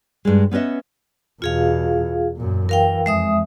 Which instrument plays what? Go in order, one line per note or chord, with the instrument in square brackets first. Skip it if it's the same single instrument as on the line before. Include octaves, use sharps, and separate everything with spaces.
[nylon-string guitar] G2 G#3
B3 C#4 B4 D#5 E5
[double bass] E2 B2 [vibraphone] F4 G#4 F5
[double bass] F#2 A#2
[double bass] E3 [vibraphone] A#4 F5 G5
[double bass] F2 [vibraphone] G#3 E5 D#6